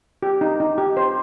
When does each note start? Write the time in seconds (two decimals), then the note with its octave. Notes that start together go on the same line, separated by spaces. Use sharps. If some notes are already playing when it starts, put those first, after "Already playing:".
0.23 G4
0.41 D#4
0.60 D#4
0.78 G4
0.97 C5